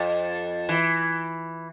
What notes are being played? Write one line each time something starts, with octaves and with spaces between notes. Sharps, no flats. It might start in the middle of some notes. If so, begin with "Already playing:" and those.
Already playing: F2
E3